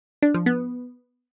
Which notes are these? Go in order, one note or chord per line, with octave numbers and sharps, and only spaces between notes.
D4
F3
B3